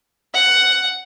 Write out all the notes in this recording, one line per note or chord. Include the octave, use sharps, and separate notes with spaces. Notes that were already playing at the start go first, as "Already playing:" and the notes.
F#5